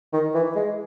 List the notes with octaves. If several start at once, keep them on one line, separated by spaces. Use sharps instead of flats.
D#3
E3
G#3